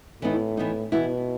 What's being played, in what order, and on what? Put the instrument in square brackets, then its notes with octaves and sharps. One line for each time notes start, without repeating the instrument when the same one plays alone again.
[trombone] A2 [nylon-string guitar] E3 B3 D#4
[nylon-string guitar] E3 B3 D#4
[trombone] B2 [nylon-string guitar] E3 B3 E4